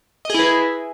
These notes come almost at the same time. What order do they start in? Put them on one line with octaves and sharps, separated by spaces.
D#5 G#4 E4 B4